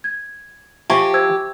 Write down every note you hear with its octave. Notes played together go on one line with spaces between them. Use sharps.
G#6
F3 G4 E5 G#5 A5 C#6
C5 E6 G#6